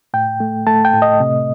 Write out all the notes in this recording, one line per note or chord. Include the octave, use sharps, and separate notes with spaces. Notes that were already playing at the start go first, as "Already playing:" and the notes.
A2 G5
A3
A3 A5
G5
A2
D#5
C3